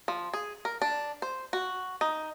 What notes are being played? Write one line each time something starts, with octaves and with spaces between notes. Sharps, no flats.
F3
G#4
A#4
D4
C5
F#4
D#4